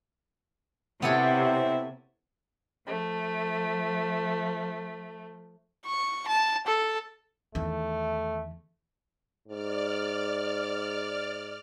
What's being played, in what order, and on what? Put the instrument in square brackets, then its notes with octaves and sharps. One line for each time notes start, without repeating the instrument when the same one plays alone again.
[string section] C3 [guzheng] B3 A4 C#5 [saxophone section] C4 E4
[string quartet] F3 A3
[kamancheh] C#6
A5
A4
[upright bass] E2 D#3 [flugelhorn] A3
[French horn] G#2 [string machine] D5 F6